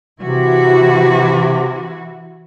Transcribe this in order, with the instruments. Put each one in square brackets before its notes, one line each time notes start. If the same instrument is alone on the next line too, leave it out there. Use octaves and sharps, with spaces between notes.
[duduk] C3 [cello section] E3 E4 F#4